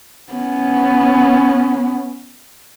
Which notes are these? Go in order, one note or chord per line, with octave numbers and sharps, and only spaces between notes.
B3 C#4